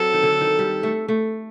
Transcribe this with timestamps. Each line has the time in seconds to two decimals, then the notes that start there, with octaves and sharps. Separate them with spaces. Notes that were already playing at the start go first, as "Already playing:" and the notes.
Already playing: F#3 C4 A4
0.13 D#3
0.23 D3
0.41 D#3
0.59 G3
0.83 A3
1.08 A3